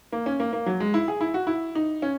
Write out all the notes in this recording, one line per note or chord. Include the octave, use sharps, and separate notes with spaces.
A#3
C#4
A#3
A#3
F#3
G#3
E4
G#4
E4
F#4
E4
D#4
C#4